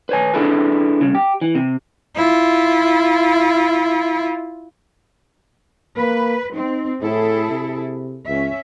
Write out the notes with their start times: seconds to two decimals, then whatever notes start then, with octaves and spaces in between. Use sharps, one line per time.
0.09 B4 C#5 G#5
0.34 D4 E4 G#4 A4 B4
1.01 C2 C#3
1.15 G4
1.41 E3
1.55 C3
2.16 E4 F4
5.97 A#3 B4
6.54 C4 D#4
7.02 A2 E4 G#4 A4
7.51 C3
8.28 C#2 C#4 E5